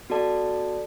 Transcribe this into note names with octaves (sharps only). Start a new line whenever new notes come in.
B3 F#4 A4 D5 A5